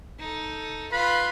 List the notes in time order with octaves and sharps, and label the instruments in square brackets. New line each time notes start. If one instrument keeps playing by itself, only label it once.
[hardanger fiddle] D#4 A4
[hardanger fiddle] F4 B5 [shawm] B4